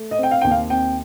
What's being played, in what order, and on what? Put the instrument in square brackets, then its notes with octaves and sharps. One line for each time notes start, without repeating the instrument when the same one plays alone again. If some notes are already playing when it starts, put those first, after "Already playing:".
Already playing: [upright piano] A3
D#5
C4
G5
F5
D#2 G5
F5
C4 G5